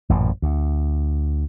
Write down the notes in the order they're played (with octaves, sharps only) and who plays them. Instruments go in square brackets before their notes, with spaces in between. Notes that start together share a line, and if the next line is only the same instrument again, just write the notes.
[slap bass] A1 F#2 A#2
D2